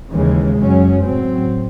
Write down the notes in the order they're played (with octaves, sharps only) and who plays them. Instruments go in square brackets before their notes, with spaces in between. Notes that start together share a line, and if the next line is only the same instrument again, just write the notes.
[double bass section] D#2 C#3 E3 G#3
F#2 C#3 F#3 C#4
A2 F#3 C4